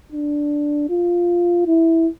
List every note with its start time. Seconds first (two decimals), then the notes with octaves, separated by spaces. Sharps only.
0.12 D4
0.90 F4
1.67 E4